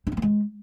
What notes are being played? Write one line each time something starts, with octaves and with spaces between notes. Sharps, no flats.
D#4
C4
A#3
G#3